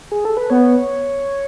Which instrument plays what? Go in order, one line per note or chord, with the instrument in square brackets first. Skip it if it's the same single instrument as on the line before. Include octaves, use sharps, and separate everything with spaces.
[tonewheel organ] G#4
A4
B4
[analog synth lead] B3 [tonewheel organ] C#5